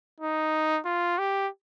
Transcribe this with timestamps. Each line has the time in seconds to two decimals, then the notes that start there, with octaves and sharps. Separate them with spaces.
0.20 D#4
0.85 F4
1.18 G4